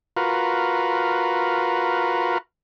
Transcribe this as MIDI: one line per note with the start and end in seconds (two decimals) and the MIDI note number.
0.17 2.38 65
0.17 2.38 66
0.17 2.38 70
0.17 2.38 71